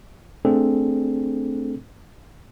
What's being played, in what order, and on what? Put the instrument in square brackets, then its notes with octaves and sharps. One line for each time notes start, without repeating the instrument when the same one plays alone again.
[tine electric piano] A3 C4 D4 G#4 A4